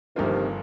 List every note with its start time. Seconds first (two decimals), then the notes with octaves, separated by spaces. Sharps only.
0.15 G1 G2 C3 D#3 F3 A#3 F4